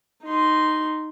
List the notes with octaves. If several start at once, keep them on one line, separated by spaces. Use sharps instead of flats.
D#4 C6